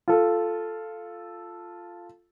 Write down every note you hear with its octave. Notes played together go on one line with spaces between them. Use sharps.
F4 A4